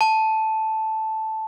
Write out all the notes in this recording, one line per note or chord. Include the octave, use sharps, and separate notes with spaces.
A5